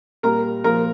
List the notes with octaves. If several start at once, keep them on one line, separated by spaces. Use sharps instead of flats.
A#2 G3 A#4 A#5
A#2 F3 A#4 A#5